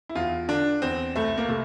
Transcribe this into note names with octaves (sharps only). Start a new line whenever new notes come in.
E4
E2 F4
D3 D4
E2 C4
C2 A3
A#3
C3 A3